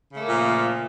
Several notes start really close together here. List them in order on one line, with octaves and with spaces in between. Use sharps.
C#3 A3 A#3 A#2 F3